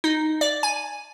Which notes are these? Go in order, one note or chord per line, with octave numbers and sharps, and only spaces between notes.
D#4
D5
G#5